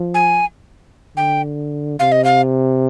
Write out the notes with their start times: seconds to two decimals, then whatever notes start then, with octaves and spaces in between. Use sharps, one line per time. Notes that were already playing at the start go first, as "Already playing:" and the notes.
Already playing: F3
0.14 G#5
1.17 D3 G5
1.99 C3 F5
2.12 D#5
2.24 F5